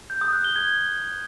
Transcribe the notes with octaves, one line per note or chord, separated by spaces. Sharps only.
G6
D#6
F#6
G7
G#6